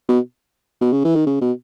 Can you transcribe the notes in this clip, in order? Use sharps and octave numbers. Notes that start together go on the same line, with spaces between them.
B2
B2
C#3
E3
D#3
C#3
B2